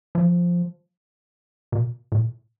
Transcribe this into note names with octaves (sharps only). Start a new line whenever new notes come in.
F3
B2
A#2